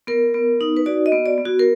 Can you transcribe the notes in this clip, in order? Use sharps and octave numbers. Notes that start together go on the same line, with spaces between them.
B3 A#4
B3
D#4
B4
F#4 D5
D#5
B3
D5
B3
F#4
A#4